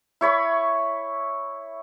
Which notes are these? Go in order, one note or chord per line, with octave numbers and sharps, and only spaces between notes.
E4 C#5 B5 C#6